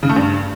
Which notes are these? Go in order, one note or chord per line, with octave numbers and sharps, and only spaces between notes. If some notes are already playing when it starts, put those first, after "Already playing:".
C#3
A3
G2